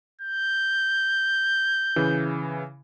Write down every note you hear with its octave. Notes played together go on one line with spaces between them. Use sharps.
G6
C#3 E3